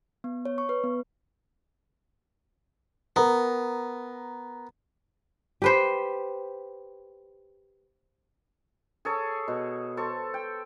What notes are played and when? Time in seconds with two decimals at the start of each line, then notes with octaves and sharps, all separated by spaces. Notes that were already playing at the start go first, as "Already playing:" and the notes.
0.24 B3
0.45 C#5
0.58 C#6
0.69 B4
0.84 B3
3.16 B3 A#4 A#5
5.62 G4 B4 C5
9.05 G#4 A4 C#5
9.48 B2
9.97 A4 C5 C#6
10.34 G5